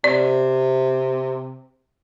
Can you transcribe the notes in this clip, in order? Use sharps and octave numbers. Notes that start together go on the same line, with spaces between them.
C3 D5